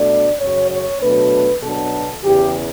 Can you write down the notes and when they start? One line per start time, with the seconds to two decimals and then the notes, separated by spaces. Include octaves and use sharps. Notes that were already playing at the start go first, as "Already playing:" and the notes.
Already playing: B2 A3 D4 D5
0.40 F#2 C#3 F#3 C#5
0.70 C#5
1.01 B2 F#3 A3 D4 B4
1.62 B2 F#3 B3 D4 A4
2.23 E2 C#3 E3 G4